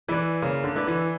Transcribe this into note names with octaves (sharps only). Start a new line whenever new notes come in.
E3 E4 B4 D5
C#3 A#3
D3
E4 B4 D5
E3